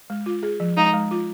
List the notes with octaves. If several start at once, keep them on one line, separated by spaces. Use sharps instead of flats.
G#3
F4
G#4
F3
G#3 D#4
G#3
F4